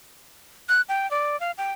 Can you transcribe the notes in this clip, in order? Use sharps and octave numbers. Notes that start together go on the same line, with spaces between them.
F#6
G5
D5
F5
G5